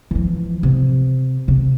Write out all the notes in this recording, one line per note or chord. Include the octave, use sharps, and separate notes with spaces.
E3 F3
C3
C3